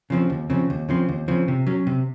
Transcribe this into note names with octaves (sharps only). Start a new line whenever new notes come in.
C#3 F3 C4
D#2
C#3 F3 C4
D#2
C#3 F3 C4
D#2
C#3 F3 C4
C3
F#3 C#4
C3